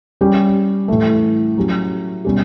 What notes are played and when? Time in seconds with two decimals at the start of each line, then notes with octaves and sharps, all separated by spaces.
0.21 G3 C#4 G4
0.88 A2 E3 A3
1.57 F#3 C#4 G4
2.24 B2 G3 C#4 G4